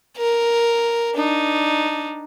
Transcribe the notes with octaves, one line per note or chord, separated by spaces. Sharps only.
A#4
D4 D#4